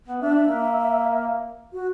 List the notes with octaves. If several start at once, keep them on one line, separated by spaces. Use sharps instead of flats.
B3
D4 E5
A#3
F#4